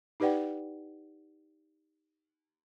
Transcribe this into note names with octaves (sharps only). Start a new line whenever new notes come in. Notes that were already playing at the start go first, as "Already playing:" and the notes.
D#4 G4 B4 D5 F#5 G5